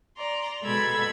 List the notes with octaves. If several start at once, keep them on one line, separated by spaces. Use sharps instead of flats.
D5 A#5 C6
B2 G#3 A4 B5 E6 G#6